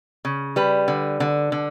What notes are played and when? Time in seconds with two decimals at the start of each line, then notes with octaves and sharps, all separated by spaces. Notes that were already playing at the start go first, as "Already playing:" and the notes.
0.25 C#3
0.56 G3 B4
0.88 D3
1.20 D3
1.52 D3